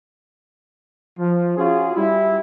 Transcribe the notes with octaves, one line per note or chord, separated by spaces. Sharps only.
F3
C#4 F4 F#4 G#4
G3 E4